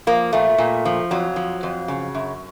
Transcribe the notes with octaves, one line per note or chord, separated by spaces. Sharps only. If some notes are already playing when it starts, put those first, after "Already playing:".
F3 A#3
A#2 A3
A#2
F3
F2 F#3
F3
F2
C#3
F#2